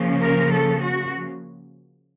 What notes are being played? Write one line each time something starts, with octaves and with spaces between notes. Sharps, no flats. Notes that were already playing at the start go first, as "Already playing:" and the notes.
Already playing: C#3 F3 A#3 C#4
A#4
A4
F#4